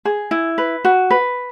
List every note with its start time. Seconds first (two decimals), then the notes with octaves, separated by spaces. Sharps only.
0.05 G#4
0.31 E4
0.58 B4
0.85 F#4
1.11 B4